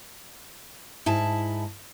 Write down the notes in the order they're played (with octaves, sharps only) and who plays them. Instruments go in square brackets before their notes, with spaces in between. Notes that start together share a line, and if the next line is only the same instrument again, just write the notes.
[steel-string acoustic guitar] G#2 E4 A5